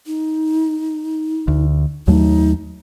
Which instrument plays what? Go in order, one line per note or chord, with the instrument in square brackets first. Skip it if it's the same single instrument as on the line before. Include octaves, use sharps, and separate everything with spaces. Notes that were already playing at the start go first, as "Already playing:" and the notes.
[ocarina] D#4
[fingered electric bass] D2
[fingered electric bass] D#2 F#3 A3 [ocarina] D#4